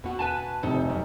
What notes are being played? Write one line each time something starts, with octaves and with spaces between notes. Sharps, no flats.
E2 B2 F#4
B4 G#5 A5
F1 C3 D#4 A4
F#2